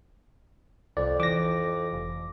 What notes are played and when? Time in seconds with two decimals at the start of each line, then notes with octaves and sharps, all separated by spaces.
0.97 C2 F2 D5
1.20 E3 D6 A#6
1.93 F1